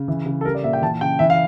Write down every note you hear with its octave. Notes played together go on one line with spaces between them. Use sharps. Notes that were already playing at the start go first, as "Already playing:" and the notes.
Already playing: C#3
E3
C#3
A4
G3 A#4
D5
A#2 E5
G5
E3 A5
C#3 G5
E3 E5
F5